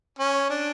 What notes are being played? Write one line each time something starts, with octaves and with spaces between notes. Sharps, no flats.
C#4
D4